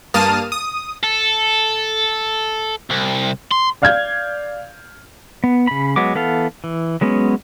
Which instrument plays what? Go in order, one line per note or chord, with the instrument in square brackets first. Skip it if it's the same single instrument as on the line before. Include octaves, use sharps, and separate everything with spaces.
[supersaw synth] G2 A#3 A5 D#6 F6 D#7
D#6
[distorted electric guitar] A4
C2
C6
[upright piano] D5 F5 F6 G6 G#6
[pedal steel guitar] B3
C#3 B5
F#3 G#3 B3 D6
E3 B3 A4 F5
E3
F#3 G#3 B3 C#4